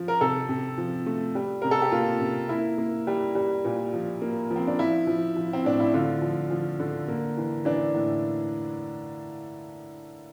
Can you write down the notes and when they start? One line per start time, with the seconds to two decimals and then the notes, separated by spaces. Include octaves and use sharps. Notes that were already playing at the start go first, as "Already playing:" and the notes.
Already playing: F3
0.08 A#4
0.21 C3 A4
0.49 C3
0.78 F3
1.06 A3
1.35 G3
1.62 C3 A#4
1.71 A4
1.82 G4
1.92 A#3 F4
2.20 C3
2.49 A#3 E4
2.78 A#3
3.07 G3
3.35 G3
3.65 A#2
3.93 F3
4.22 A#3
4.50 F3
4.56 C4
4.67 D4
4.79 F3 E4
5.07 F3
5.36 F3
5.53 C4
5.65 A2 D4
5.80 E4
5.94 D3 F4
6.22 F3
6.50 F3
6.80 D3
7.08 A#3
7.37 E3
7.65 E3 D4
7.95 A2